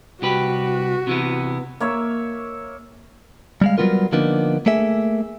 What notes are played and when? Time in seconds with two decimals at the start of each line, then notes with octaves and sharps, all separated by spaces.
0.22 C2 F#4 G4 B4
1.07 C3 E3 B3
1.80 A#3 C#5 E5
3.61 G3 G#3 F5
3.78 F#3 G3 A#3 B3 F4 A#4
4.12 D3 F3 A#3 B3 D4 D#4
4.66 A3 A#3 G#4 E5